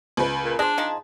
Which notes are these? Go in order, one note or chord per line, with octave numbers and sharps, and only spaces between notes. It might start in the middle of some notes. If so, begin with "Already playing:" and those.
C#2 B4
A#2
D4 G#4 C5 D#5
F3 D#4 A5